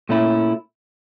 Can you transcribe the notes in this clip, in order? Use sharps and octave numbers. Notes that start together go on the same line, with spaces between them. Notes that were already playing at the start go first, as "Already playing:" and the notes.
A#2 A3 C#4 E4